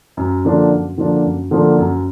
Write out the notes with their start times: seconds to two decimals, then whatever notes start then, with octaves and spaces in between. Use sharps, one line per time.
0.17 F#2
0.45 D3 F3 A#3 D4
0.71 F#2
0.98 D3 F3 A#3 D4
1.25 F#2
1.51 D3 F3 A#3 D4
1.78 F#2